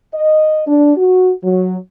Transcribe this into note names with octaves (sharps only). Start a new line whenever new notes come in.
D#5
D4
F#4
F#3